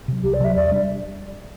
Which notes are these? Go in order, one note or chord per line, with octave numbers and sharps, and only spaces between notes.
C3 F#3
C2 G4
D5
C3 F#3 E5
E2 D5
G3 D4